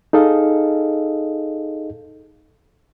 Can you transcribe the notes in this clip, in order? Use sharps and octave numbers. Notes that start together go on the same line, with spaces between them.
D#4 G#4 A4 D#5 F5